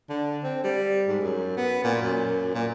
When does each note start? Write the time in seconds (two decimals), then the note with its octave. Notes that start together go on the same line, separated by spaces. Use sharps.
0.09 D3
0.43 C4
0.64 G3
1.08 G#2
1.21 F#2
1.57 B3
1.84 A#2
2.01 F#2
2.54 A#2